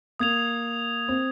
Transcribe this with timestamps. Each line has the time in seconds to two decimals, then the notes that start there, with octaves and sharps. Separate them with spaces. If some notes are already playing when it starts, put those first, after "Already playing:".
0.19 A#3 D#6 G#6 F7
1.08 C4